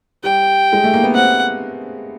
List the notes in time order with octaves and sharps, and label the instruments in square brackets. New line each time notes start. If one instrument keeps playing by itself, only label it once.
[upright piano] G3 [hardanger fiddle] G5
[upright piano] G#3
A3
A#3
B3
[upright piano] C4 [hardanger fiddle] F#5